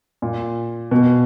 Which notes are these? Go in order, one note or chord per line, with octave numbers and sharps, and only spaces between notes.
A#2
B2